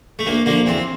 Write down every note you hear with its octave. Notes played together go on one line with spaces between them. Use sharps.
A3
D2 A#3
D3 F3 A#3
E2 C4